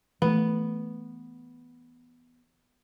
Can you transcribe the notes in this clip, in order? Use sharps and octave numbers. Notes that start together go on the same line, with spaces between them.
E3 A3 B3